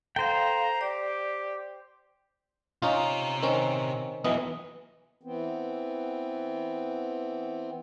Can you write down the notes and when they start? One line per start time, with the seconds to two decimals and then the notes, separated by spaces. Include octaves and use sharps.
0.16 A4 C5 F5 G5 A#5
0.81 G4 D5
2.82 C3 C#4 D#4 F4 A#5
3.43 D#3 C4 C#4
4.24 B1 E3 B3 E4 D#5
5.23 E3 B3 C4